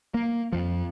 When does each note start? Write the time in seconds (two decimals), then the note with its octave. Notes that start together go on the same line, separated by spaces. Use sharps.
0.14 A#3
0.53 F2 F3